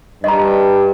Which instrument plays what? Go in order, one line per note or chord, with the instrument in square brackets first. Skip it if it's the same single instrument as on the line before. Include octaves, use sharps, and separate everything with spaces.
[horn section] G2 [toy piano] D#5 A#5